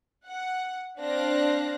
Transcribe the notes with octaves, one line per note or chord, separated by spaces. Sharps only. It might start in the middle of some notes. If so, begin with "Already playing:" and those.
F#5
C4 D4 F5 F#6 A#6